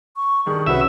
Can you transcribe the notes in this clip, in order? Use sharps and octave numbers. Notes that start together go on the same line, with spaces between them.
C#6
G2 D#3 G#4
C2 C#4 F#4 B4 E5